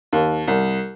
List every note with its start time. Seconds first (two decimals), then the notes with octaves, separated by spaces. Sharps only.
0.13 D#2
0.47 C2